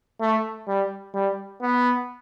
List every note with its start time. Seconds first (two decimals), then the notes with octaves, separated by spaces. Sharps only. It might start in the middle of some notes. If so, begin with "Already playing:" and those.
0.21 A3
0.68 G3
1.14 G3
1.62 B3